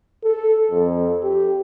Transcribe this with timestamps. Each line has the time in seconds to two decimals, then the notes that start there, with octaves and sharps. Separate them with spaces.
0.24 A4
0.71 F2
1.23 G4